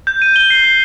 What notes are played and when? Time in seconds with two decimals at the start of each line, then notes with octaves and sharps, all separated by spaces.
0.07 G6
0.22 D#7
0.36 G7
0.50 C7
0.64 G6